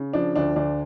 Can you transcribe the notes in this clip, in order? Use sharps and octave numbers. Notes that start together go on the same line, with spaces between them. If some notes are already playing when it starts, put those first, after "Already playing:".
Already playing: C#3
F3 D4
D2 D4
D2 D4